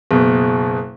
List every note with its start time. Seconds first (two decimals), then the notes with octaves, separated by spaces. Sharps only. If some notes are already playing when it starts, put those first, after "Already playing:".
0.11 F#1 B2